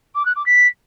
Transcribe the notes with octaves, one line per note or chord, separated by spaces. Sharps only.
D6
F#6
D6
B6